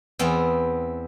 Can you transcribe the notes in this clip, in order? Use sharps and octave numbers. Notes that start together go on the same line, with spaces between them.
E2 B3 C4